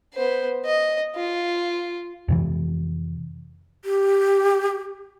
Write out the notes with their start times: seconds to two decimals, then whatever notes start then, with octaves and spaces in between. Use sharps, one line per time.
0.14 B3 C5
0.65 D#5
1.16 F4
2.28 F2 C3 E3
3.85 G4